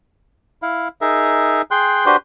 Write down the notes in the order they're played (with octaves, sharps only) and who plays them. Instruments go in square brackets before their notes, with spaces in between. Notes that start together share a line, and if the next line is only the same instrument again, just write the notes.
[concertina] E4 F5
D#4 G#4 A#4 E5
G#4 G5 C6 F#6
D4 F#4 G4 B4 C5 C6